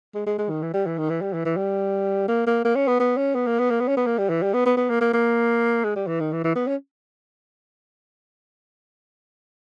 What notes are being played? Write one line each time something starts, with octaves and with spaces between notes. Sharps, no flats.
G#3
G#3
G#3
D#3
E3
G3
E3
D#3
E3
G3
E3
E3
G3
A#3
A#3
A#3
C#4
B3
B3
C#4
B3
A#3
B3
A#3
B3
C#4
B3
A#3
G3
E3
G3
B3
B3
B3
A#3
A#3
A#3
G#3
G3
E3
D#3
E3
E3
B3
C#4